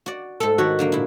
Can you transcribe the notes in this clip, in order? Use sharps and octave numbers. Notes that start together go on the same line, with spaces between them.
F#4 D5
G#2 A4
D#3 F#4 G4 C#5
D3 F#3 A#3
A#2 E4